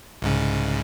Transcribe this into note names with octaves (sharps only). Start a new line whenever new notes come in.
C2 G#2 C#3